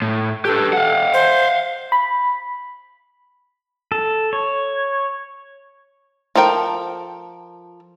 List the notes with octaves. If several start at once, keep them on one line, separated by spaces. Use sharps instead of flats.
A2
G4 A4 B4
F5 F#5
C5
B5
A4
C#5
F3 A4 A#4 G5